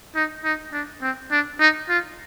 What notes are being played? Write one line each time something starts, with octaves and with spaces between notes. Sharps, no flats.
D#4
D#4
D4
C4
D4
D#4
F4